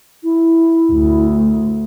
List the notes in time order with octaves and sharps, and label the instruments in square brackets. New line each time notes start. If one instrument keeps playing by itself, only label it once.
[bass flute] E4
[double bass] D2